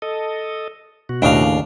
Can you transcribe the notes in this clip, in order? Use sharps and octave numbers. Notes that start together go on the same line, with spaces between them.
A4 D#5
B2 F#4
D#2 A2 C#3 D4 F5